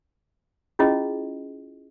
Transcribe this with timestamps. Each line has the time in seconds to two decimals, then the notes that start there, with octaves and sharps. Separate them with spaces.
0.79 C#4 E4 F4 G#4 D#5